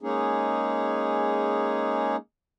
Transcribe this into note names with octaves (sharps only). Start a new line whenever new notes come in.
G#3 A#3 C#4 D#4 G#4